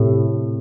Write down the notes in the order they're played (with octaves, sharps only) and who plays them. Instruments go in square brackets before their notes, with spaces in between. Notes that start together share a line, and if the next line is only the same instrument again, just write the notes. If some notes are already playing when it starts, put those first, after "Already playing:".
Already playing: [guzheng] A2 C3